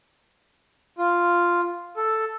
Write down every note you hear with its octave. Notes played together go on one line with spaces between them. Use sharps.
F4
A4